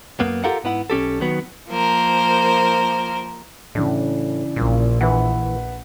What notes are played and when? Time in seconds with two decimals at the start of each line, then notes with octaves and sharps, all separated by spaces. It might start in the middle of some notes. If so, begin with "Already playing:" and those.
0.20 F#2 A#3 B3
0.44 F4 G4 A4 A#4 F5 F#5
0.64 G#2 B3 E4 F#5
0.90 B1 C#4 G4 A4
1.20 D#3 F#3 B3
1.69 F3 A#3 A#4 C5
3.75 A2 C#3 E3 D4
4.56 A#1 A#2
5.01 E3 B4 E5 F#5